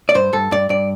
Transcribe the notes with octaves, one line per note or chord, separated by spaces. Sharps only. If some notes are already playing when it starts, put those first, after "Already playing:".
D5
G2 C5
G2 A4
G2 D5
G2 D5